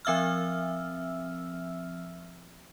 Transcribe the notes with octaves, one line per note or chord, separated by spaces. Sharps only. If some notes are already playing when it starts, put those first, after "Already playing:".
F3 C4 E5 E6 F6